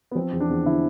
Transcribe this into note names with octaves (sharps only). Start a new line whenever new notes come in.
B3
F3 C4
E2
D4
E2
D3 E4